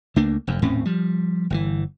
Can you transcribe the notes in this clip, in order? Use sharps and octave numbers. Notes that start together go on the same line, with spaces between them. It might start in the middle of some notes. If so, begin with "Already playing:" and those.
C#2 A3 A#3 D4
F1 F#2
D#1 A2 C4 C#4
F3 G3
G1 C3 E3